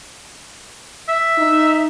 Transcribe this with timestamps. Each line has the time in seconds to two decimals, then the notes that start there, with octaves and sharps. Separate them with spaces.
1.08 E5
1.38 D#4